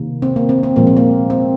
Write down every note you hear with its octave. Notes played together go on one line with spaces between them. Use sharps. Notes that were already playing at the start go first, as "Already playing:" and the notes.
Already playing: C3 D#3 A#3
C4
A#3
C4
C4
A#2 F3 G#3 A#3
C4
A#3
C4